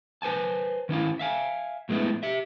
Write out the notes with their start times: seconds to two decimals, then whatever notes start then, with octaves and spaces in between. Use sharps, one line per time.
0.22 B4 C5 G#5 A5
0.89 D#3 C#4 E4 F5
1.19 E5 F5 G#5
1.89 A2 F3 G#3 A3 B3 E4
2.23 G4 E5